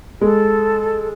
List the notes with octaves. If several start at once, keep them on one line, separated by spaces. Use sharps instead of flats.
G#3 A4